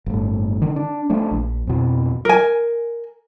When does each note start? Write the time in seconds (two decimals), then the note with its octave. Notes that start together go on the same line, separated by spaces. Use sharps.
0.06 G1 A2
0.62 D3 D#3
0.76 D4
1.10 F3 A3 D4
1.31 A#1
1.67 F2 B2
2.25 A#4 G#5